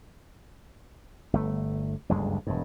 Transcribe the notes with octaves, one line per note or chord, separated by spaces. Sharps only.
G1 A3
F#1 D2 G2 G#3
E1 G2